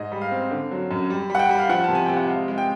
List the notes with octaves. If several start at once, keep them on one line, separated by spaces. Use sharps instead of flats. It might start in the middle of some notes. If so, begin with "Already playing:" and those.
Already playing: G#2 D#5
G3
F5
C4
D3
F#3
F#2
G3
G3
F#5
G5
G3
F5
F3 F#5
C3 A5
G#5
C3 G5
F#5
G#3 F5
G#3
G5